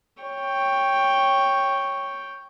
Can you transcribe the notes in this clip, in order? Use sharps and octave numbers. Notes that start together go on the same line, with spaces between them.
C#5 G5